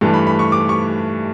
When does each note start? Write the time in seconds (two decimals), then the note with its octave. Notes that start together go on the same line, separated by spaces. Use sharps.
0.01 G2 E3 A3 D4
0.14 B5
0.27 B5
0.39 C#6
0.52 D6
0.69 C#6